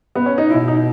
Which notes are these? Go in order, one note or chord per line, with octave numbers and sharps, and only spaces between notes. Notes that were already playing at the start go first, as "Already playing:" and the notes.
B3
C#4
D#4
B2 E4
D#4